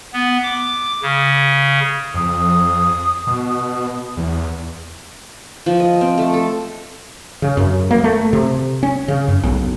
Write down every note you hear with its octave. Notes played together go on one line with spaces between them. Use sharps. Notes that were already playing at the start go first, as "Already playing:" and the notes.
B3
D6
C#3
F2 D#6
B2
E2
F3
D#5
C4
A3
A4
C#3
F#2
A#3
A3
C3
C#4
C#3
F#2
B1